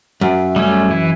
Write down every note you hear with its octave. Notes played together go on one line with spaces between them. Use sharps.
F#2 E5
G3 A3 C#4
E3 E4